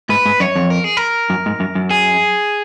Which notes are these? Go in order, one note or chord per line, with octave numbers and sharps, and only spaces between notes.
G#2 B4
G#2
F#2 C#5
F2
A#4
G#4
A#4
F#2
G#2
F#2
F#2
G#4